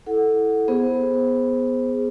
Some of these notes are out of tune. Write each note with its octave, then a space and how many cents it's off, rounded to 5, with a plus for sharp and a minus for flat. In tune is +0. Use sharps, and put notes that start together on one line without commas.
E4 +0 A4 +0 F#5 +0
B3 +0 G#4 +0 C5 +0